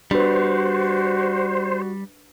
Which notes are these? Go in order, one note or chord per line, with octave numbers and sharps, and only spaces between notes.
G3 D4 F#4 B4 C5